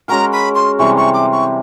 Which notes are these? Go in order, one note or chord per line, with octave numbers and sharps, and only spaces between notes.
G#3 C#4 F#4 A#4 A#5
B5
C6
C3 E3 G3 C4 C#6
C#6
D6
C#6